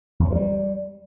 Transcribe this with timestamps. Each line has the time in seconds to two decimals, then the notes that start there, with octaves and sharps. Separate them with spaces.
0.20 E2
0.25 F#3
0.30 E3
0.36 G3